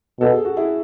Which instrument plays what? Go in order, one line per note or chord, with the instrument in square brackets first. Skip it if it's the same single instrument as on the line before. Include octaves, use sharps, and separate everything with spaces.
[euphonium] B2 [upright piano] A4
[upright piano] G#4
F#4
E4 G#4